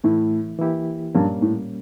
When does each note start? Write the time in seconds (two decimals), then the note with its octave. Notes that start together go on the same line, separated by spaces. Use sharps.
0.04 A2 E3 A3 E4
0.59 E3 A#3 E4 G4
1.15 G2 A#2 G3 A#3 C#4
1.42 A2